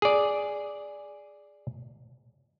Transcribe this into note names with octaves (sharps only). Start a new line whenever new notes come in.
G#4 D5